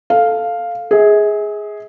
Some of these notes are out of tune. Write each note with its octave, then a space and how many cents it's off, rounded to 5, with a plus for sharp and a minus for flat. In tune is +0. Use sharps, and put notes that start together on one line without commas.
A4 +0 F5 +0
G#4 +0 E5 -45